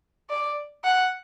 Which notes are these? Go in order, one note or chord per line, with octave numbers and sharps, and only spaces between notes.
D5
F#5